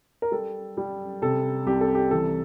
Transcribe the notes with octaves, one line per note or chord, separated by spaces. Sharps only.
A#4
G3 A4
G3
C3 A4
C2 G4
A4
G4
E3 A4